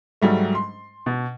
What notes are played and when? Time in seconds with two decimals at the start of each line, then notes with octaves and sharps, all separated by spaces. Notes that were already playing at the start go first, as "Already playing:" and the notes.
0.22 G#2 F#3 G3 A3
0.55 C6
1.06 B2